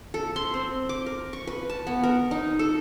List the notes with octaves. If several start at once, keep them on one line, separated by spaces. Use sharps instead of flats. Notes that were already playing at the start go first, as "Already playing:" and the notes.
A4
C6
C4
D6
A#4
C#6
B4
A5
B3
A#4
D#4
A4